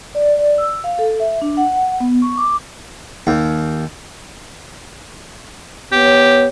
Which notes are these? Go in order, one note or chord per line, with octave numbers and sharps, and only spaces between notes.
D5
D5
E6
F5
A4
E5
D4
F#5
B3
C#6
D6
D#2
B3 G4 C#5